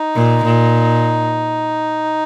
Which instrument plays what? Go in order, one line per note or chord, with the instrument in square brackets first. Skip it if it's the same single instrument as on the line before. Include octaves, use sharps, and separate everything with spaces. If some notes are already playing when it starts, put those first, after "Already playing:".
Already playing: [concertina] D#4
[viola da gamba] A#2
A#2